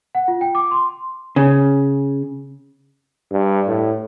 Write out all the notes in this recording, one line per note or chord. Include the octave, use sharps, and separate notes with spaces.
F#5
F4
G5
D6
C6
C#3
G2
A2